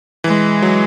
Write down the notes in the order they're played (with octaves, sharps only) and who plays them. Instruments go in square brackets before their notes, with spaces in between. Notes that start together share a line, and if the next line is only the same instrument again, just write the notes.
[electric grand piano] E3 [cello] G#3
[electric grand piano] F#3